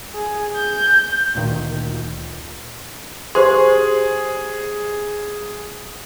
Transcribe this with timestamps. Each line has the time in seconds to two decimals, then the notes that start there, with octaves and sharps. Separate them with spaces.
0.14 G#4
0.56 G6
1.35 D2 A#2 D#3
3.35 G4 G#4 C5 C6